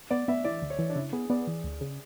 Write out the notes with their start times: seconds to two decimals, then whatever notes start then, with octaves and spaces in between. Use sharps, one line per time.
0.11 B3 D5
0.28 B3 E5
0.45 E3 D5
0.62 D2
0.70 C#5
0.79 E3
0.90 D4
0.96 C#3 E4
1.13 B3 G#4
1.30 B3 D5
1.47 E3
1.64 D2
1.81 C#3